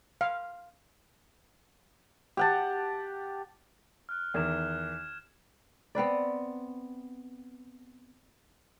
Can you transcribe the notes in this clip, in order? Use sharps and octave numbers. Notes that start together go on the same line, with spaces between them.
F5
G4 F#5 A5
F6 F#6
E2 D#3 F6 G#6 E7
B3 C4 B4 D5